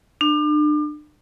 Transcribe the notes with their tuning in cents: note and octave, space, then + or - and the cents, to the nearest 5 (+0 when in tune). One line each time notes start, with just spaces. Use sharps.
D4 +35